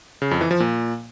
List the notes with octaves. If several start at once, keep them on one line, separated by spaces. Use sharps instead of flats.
C#3
F2
E3
F3
A#2